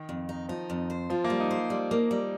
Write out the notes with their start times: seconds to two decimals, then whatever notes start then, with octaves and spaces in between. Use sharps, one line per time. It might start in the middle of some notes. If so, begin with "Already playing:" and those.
Already playing: D#3
0.09 F2
0.29 D#4
0.49 F3 D#4
0.70 F2
0.90 C5
1.10 F3 F4
1.24 A#3
1.30 G3
1.40 D#4
1.51 C5
1.70 G3
1.91 A#3
2.11 G3